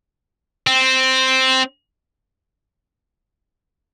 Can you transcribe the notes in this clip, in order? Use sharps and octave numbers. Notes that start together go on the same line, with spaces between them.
C4